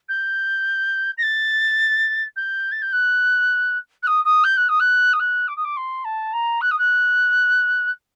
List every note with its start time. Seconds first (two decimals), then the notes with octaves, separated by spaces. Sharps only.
0.09 G6
1.18 A#6
1.23 A6
2.36 G6
2.72 A6
2.82 G6
2.93 F#6
4.03 F#6
4.07 D#6
4.25 D#6
4.44 G6
4.57 F#6
4.69 D#6
4.80 F#6
5.13 D#6
5.20 F#6
5.48 D6
5.57 D#6
5.65 D6
5.77 C6
6.05 A5
6.33 A#5
6.61 F#6
6.71 D#6
6.79 F#6